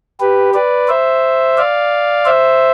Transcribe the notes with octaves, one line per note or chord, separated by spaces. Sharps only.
G4 B4
B4 D5
C5 E5
D5 F5
C5 E5